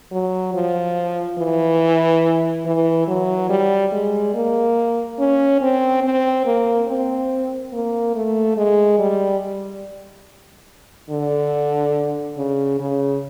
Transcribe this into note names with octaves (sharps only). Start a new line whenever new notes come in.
F#3
F3
E3
E3
F#3
G3
G#3
A#3
C#4
C4
C4
A#3
C4
A#3
A3
G#3
G3
D3
C#3
C#3